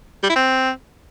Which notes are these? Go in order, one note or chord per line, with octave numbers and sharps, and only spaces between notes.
G3
E4
C4